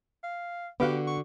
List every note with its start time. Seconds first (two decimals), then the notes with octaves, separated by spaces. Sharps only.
0.23 F5
0.80 D3 B3 F#4 G4 F5 F#5
1.07 C#6